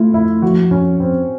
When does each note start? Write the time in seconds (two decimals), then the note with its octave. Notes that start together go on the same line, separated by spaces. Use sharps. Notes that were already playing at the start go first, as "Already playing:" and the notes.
Already playing: A3 E4 F4
0.14 F2 E4
0.42 F3 F#4
0.71 F2 C#4
1.00 F2 C4